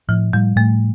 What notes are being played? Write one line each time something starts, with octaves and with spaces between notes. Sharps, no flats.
A2 F3
A2 G3
A2 A3